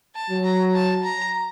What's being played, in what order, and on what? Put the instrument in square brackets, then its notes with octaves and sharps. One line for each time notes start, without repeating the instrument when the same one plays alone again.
[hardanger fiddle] A5
[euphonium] F#3
[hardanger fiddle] A#5
A5
A#5